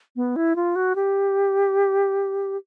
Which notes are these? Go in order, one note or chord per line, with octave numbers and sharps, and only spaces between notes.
B3
E4
F4
F#4
G4